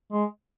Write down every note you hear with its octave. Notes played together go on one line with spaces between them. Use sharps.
G#3